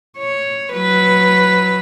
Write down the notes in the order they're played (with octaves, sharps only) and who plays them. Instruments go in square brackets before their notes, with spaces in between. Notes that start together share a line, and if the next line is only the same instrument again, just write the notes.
[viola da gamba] C#5
F#3 B4